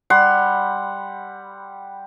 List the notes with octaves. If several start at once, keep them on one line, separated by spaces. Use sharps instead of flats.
G3 F#5 C6